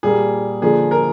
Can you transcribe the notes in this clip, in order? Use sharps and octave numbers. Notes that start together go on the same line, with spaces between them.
A#2 G3 A#3 G#4
D3 F3 A#3 G#4
A#4